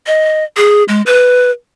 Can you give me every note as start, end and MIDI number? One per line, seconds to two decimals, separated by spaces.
0.07 0.44 75
0.57 0.83 68
0.88 1.02 56
1.06 1.50 71